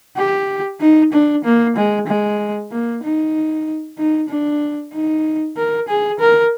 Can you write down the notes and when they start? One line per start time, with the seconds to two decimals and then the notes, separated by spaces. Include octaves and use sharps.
0.17 G4
0.81 D#4
1.13 D4
1.44 A#3
1.76 G#3
2.07 G#3
2.71 A#3
3.03 D#4
3.98 D#4
4.29 D4
4.94 D#4
5.57 A#4
5.88 G#4
6.19 A#4